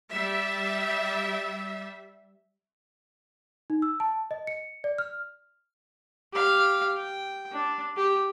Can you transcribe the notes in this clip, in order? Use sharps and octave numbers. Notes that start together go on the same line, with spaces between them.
G3 E5
D#4
E6
A5
D#5
C#7
D5
F6
G4 F5
G5
D4
G4